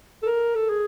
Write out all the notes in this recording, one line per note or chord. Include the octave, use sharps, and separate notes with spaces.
A4
A#4
A4
G#4